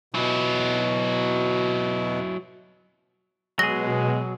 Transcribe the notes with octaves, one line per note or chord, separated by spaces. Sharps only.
B2 F#3 E4
B2 F#3 G#3 G#4 A#6